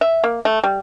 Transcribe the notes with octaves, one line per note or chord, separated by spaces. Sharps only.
E5
A#3
A3
G3